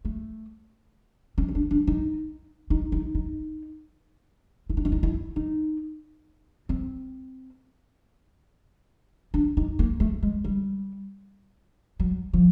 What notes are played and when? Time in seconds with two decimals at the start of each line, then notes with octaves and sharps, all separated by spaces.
0.05 A3
1.38 C#4
1.48 C#4
1.55 D4
1.71 D4
1.87 D#4
2.70 D#4
2.92 D#4
3.15 D#4
4.70 E4
4.77 D#4
4.85 D4
4.92 D#4
5.03 E4
5.36 D#4
6.69 C4
9.34 D4
9.57 D#4
9.79 A#3
10.00 A3
10.23 G#3
10.44 G3
12.00 F#3
12.33 F3